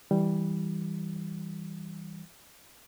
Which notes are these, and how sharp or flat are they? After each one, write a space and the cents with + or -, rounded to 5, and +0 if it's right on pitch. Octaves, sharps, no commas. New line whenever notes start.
E3 -15 G3 +0